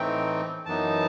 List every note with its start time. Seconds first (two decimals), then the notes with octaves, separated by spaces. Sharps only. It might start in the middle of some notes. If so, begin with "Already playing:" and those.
Already playing: A2 E3 A3 C4 D#4 G5
0.66 F#2 E3 B3 D#4 A5